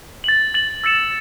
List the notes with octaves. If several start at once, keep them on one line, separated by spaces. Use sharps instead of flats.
A6 F#7
A6 F#7
E6 A6 C#7 E7